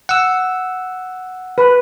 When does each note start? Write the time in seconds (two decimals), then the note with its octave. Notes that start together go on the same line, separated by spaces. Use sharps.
0.09 F#5 E6
1.58 B4